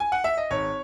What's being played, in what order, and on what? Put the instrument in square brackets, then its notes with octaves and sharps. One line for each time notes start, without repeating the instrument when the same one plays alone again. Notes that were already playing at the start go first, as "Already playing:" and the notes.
[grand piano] G#5
F#5
E5
D#5
G#1 C#5